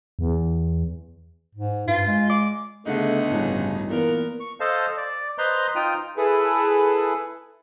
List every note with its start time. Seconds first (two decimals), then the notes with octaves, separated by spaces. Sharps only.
0.19 E2
1.55 G#2
1.88 G2 F4
2.07 G#3
2.29 D6
2.86 D2 C#3 A3 B3 D#4 F5 F#5
3.30 A1 G2 C#3
3.89 A#2 E3 A#3 B3 A#4
4.40 C#6
4.60 A4 C5 D#5 F5 A5
4.97 D5
5.38 B4 C5 D#5 A#5 C6
5.76 D#4 F4 G5 D#6 F6
6.17 E4 G#4 A4 B4